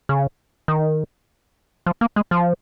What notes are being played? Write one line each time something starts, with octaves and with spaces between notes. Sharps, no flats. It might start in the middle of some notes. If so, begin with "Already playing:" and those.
C#3
D#3
F3
A#3
G#3
F3